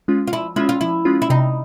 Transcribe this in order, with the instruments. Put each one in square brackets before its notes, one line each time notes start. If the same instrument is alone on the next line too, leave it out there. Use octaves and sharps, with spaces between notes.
[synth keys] G#3 C#4 F4
[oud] F4
[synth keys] F3 [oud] E4
[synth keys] G#3 C#4 F4 [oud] E4
[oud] F4
[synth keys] F3 [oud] E4
[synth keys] G#3 C#4 F4
[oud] E4
[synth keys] C3 [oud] D#4